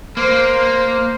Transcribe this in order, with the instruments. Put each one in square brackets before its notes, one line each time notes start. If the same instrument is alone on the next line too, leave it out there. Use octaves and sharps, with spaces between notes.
[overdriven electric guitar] A#3 [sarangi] C5